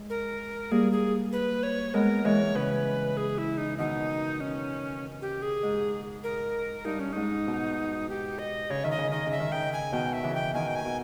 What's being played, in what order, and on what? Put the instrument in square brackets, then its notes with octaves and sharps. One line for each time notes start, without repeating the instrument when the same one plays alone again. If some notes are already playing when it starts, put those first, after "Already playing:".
Already playing: [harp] G#3
[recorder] A#4
[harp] G3 A#3 [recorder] G#4
[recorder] G#4
B4
C#5
[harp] G#3 B3 [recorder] A#4
[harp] E3 G#3 [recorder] C#5
[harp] C#3 E3 [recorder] B4
[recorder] G#4
E4
D#4
[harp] B2 D#3 [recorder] D#4
[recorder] C#4
G4
G#4
[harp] G#2
[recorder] A#4
[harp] G2 [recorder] D#4
[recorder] C#4
[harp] G#2 [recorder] D#4
[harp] B2
[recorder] G4
D#5
[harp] C#3 [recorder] C#5
[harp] D#3 [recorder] E5
[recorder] D#5
[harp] C#3
[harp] D#3 [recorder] D#5
[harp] C#3
[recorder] E5
[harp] D#3
[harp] C#3 [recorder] G5
[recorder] G#5
[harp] B2 D#3 [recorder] G5
[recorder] E5
[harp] C#3 E3
[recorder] G5
[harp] B2 D#3 [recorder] G#5
[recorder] G5
G#5
[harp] B2